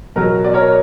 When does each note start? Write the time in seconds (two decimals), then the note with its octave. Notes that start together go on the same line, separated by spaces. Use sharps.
0.16 B2 F#3 A#4
0.45 D5
0.54 A#4 C#5